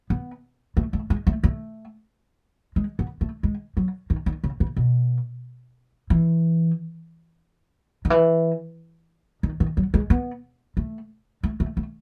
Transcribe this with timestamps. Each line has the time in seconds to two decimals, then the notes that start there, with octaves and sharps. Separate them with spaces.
0.10 B3
0.77 A3
0.93 A3
1.10 G#3
1.27 A3
1.44 A3
2.76 G#3
2.99 B3
3.21 A3
3.43 G#3
3.77 F#3
4.10 D#3
4.26 D#3
4.44 C#3
4.60 C#3
4.76 B2
6.10 E3
8.05 D#3
8.10 E3
9.43 D#3
9.60 D#3
9.77 F#3
9.94 G#3
10.10 B3
10.77 A3
11.43 A3
11.60 A3
11.77 A3